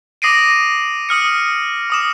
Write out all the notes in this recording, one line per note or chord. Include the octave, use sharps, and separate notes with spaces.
D6 D#6 A#6 C7 D7 D#7
D#6 F6 C#7
D6 D#6 E7